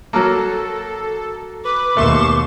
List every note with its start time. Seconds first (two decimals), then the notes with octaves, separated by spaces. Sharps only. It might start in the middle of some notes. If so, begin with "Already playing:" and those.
0.13 F#3 A#3 A4
1.65 B4 D6
1.97 D#2 B2 A3 C6 C#6 E7